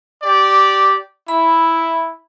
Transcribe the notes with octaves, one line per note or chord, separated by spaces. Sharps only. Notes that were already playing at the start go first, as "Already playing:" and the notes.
G4 D5
E4 B5